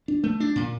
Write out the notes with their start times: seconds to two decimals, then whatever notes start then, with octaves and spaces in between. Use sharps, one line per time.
0.08 D4
0.24 A3
0.40 D4
0.56 A#2